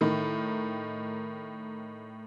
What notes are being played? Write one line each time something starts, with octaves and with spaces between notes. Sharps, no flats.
A2 D#3